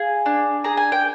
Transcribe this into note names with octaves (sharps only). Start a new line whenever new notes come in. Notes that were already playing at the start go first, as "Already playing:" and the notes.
Already playing: G#4 F5
D4
G#4 A#5
G#5
G5